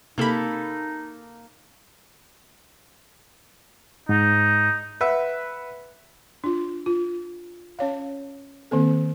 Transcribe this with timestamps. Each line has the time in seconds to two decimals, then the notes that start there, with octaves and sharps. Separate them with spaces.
0.18 C3 A#3 D#4 A4 B5
4.09 G#2 D#4
5.01 B4 E5 F#5 E6
6.44 D4 F4
6.86 F4
7.79 C#4 C#5 F5
8.71 D#3 A#3 C4 A4